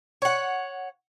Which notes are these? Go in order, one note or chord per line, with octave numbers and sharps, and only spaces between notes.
C#5 F#5